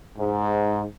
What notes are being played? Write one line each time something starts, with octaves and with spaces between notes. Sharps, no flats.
G#2